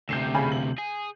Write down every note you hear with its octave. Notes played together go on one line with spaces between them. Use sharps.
D2 C3 G6 C7 E7
C#3 G#5 B5
F#7
G#4